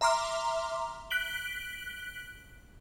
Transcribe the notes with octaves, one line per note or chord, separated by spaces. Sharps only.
E5 A#5 C6 D6 F6
F#6 B6 D7 F#7 G7